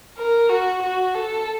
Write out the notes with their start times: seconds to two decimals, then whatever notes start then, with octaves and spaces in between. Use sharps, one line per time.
0.17 A#4
0.49 F#4
0.83 F#4
1.15 A4